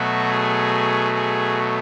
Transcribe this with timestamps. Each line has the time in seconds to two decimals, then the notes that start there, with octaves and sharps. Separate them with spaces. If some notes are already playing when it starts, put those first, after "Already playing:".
Already playing: B2 F#3 A3 F#4
0.28 G#4
1.14 G#4